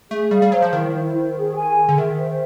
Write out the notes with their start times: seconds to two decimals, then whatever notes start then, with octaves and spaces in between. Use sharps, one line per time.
0.11 A3 G#4
0.31 G3 F5
0.42 G3
0.52 F#3 C5
0.62 F3
0.73 D#3 E4
0.93 E4
1.14 C5
1.36 G#4
1.56 G#5
1.77 G#4
1.89 D3
1.98 D#3 E5
2.18 C5